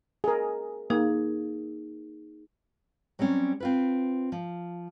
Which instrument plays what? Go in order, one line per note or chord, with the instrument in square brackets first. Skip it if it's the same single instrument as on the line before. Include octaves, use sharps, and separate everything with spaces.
[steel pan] G#4 A#4
[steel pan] A#3 [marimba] D#4 G#4
[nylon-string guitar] F#3 G3 C4 C#4
C4 F4 B4
F3